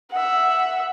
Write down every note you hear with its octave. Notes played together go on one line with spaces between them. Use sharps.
E5 F#5